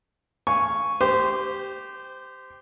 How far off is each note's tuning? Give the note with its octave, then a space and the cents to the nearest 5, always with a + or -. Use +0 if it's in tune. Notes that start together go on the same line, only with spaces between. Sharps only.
F5 +0 G#5 +0 C#6 +0
G4 +0 C5 -20